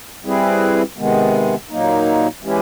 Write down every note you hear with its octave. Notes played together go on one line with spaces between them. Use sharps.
G3 C4 E4 G#4 B4
C3 D#3 G#3 B3
A#2 F#3 A#3 D#4
E3 G#3 C#4 E4 G4